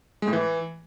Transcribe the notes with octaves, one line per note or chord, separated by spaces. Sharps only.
G#3
A2
E3